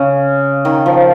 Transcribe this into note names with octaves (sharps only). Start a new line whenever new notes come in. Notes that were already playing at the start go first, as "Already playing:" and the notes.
Already playing: C#3
D#3
F3